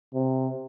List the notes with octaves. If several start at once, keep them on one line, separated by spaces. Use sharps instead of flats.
C3